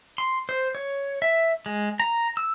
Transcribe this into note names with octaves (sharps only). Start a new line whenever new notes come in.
C6
C5
C#5
E5
G#3
A#5
E6